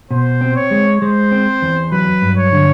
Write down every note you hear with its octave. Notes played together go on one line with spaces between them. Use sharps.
B2 C5
C4
C#5
G#3
G#3 C5
C4
E2
F#3 B4
G2
C#5
D3